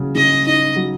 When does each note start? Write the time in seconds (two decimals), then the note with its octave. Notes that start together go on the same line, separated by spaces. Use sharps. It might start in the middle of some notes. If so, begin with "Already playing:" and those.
Already playing: C#3 F#3
0.15 C#3 D#5
0.47 D#4 D#5
0.76 F#3